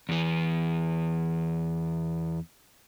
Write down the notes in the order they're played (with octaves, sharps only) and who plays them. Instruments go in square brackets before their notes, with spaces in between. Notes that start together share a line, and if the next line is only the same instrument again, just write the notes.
[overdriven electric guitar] E2 E3